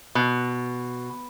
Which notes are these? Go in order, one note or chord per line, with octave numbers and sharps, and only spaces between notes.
B2